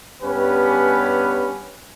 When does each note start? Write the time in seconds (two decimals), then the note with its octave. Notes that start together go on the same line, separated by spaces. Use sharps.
0.23 G2 B3 C#4 G4 B4